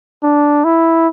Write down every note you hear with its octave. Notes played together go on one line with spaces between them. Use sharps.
D4
E4